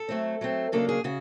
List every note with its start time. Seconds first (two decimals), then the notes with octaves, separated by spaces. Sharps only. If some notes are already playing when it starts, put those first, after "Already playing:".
Already playing: A4
0.09 F#3 A3 C4
0.41 F#3 A3 C4
0.72 C#3 F#3 A#3 D4 A4
0.89 G#4
1.04 C#3 F#4